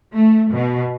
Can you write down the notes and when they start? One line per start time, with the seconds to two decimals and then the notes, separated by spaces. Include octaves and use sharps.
0.14 A3
0.52 B2